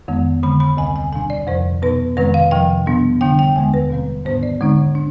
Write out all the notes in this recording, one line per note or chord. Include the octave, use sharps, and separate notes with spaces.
F2 D#3 G#3 B3
D3 G#3 C4 B5
B5
D2 C3 G3 G#5
G#5
B2 G3 D4 G#5
D5
F2 C3 F3 C5
B2 B3 D#4 B4
F2 C3 D#3 G#3 C4 B4
F5
F2 C3 F3 G5
B2 G3 B3 D4
D3 G3 D4 G5
G5
D#2 D3 G#3 B3 D4 G#5
B4
B2 G3 C4
G#2 D#3 B3 D4 C5
D5
D3 G#3 C4 D#4
D4